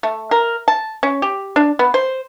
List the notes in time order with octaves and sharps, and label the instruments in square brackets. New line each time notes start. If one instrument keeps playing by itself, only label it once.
[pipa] A3
A#4
A5
C#4
G4
D4
B3
C5